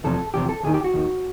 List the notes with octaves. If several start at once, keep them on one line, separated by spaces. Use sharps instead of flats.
E2 C3 F3 A4
E2 C3 F3 G4
A4
D#2 D#3 G#4
G4
F#4
D#2 D#3